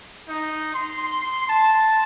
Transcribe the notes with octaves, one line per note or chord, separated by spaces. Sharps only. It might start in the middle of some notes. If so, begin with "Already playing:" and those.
D#4
C6
A5